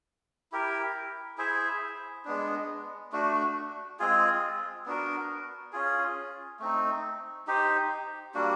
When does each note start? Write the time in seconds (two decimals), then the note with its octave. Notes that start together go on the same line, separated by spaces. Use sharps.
0.52 E4 G4 A#4
1.38 E4 G#4 C5 E5
2.25 G#3 B3 D4
3.12 A3 D4 F#4
3.99 G#3 C4 F4 G#4
4.86 B3 D4 F#4 A#4
5.73 C#4 F4 G#4
6.60 A3 C4 D#4
7.47 D#4 G4 C5
8.34 G3 A#3 D4 F#4